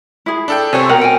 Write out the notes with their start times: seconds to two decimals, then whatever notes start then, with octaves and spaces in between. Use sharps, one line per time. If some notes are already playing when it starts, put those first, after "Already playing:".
0.26 E4 G#4
0.48 D4 A4 G5
0.73 C3 C4 C5 C#5 G#5
0.89 B2 A#4 F#5 G5
1.01 G5 G#5